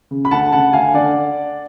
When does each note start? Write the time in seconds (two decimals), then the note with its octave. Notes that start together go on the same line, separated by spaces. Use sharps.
0.11 C#3
0.25 B5
0.31 D2 F#5 A5
0.52 C#3 F#5 A5
0.73 D2 F5 G#5
0.94 D3 D5 F#5